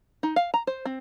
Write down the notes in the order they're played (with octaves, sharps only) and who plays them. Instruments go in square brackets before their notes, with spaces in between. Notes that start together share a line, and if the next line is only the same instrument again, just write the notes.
[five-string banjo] D#4
F5
A#5
C5
C4